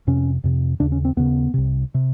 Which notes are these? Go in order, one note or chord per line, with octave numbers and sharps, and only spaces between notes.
F2 C3 C#4
F2 C3
D#2 C#3 D4
C#4
C4
D#2 C#3 B3
C2 C3
C3